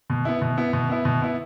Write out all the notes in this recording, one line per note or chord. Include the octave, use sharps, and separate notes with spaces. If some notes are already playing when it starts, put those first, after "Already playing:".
B2
B3 E4
B2
B3 E4
B2
B3 E4
B2
B3 E4